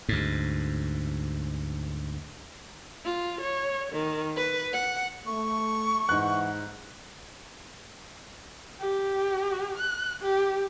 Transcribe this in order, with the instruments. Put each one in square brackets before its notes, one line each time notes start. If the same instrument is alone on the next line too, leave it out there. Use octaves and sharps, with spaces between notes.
[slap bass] D2 G#2
[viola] F4
C#5
D#3
B4
F#5
[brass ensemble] A3 [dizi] C#6
[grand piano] G#2 F#6 [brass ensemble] E3 F#5
[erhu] G4
F#6
G4